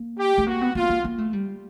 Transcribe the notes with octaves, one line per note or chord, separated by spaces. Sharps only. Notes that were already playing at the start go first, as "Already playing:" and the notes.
Already playing: A#3
G4
A3
A#3 F#4
B3
A#3 F4
A#3
A#3
A3
G3